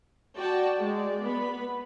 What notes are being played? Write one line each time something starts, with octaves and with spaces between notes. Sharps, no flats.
F#4 D5 G5 A5
G#3 D5
B3 B5